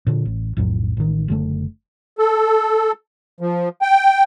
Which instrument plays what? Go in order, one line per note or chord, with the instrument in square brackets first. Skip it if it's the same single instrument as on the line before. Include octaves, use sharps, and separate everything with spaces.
[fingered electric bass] A#2 D3
A1
B1 F2 A2 F#3
A1 D#3
F#1 D3 A3
[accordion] A4
F3
G5